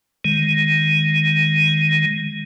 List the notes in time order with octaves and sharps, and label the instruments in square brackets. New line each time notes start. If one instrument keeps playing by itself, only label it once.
[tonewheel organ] D#3 G#3